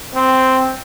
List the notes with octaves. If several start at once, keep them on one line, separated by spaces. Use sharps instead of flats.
C4